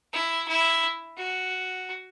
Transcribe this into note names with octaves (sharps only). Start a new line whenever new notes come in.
E4
E4
F#4